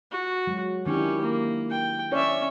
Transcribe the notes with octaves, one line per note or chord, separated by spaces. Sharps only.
F#4
F#3 G#3
D#3 C#4 D4 E4 G4
A#3
G5
C#4 C#5 D5 E5